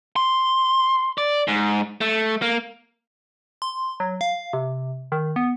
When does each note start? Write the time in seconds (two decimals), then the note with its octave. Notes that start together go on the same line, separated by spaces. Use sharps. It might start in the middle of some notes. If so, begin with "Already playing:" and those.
0.16 C6
1.18 D5
1.48 G#2
2.01 A3
2.42 A#3
3.62 C6
4.00 F#3
4.21 F5
4.53 C3
5.12 D#3
5.36 B3